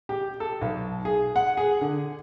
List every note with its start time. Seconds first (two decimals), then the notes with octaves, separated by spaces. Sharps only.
0.09 G4
0.40 A4
0.61 B1
1.05 G#4
1.36 F#5
1.57 G#4
1.81 D3